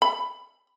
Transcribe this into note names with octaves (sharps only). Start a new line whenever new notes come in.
B5